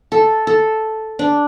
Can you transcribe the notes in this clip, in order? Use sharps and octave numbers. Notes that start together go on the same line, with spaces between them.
A4
A4
D4